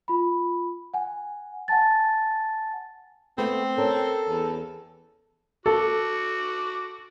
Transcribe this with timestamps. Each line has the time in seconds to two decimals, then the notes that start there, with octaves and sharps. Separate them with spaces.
0.08 F4 B5
0.94 F#5 G#5
1.68 F#5 G#5 A5 A6
3.38 A3 B3 C4
3.77 C#4 A4 A#4
4.29 E2
5.66 F#4 A4 D6